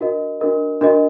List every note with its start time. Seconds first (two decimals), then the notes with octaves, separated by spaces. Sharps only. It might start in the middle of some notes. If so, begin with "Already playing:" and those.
0.01 D4 F#4 A#4 D#5
0.41 D4 F#4 A#4 D#5
0.81 D4 F#4 A#4 D#5